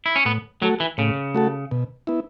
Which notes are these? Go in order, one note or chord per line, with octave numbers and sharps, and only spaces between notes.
E4
C#4
A2 B3
F#3 A3 F#4 A4
E3
A2 C#3
A3 F#4 A4
B2
B3 E4